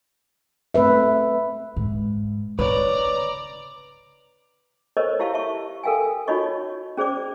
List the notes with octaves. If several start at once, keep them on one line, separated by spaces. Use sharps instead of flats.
A3 C4 B4 E5
G#2
C#3 B4 C#5 D5 A#5
A4 A#4 C5 C#5 D#5 C#6
E4 G4 F5 A5 C#6
E5 A5 C#6
A4 A#4 F5 G5 G#5
D#4 F4 F#4 C#5 D#5 C#6
C#4 G#4 C5 D5 D6